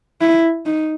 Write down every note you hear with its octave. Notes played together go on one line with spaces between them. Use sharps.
E4
D#4